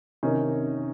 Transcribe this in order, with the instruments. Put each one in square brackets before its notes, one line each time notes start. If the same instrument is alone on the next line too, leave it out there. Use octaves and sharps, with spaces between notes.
[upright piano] C3 D#3 C#4 D#4